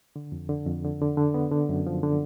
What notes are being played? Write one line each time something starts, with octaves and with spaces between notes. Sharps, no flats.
D3
F2
D3
F2
D3
D3
D3
B3
D3
F#2
F3
D3